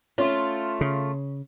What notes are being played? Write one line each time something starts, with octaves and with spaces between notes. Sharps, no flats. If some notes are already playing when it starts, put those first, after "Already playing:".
A3 C#4 F4
C#3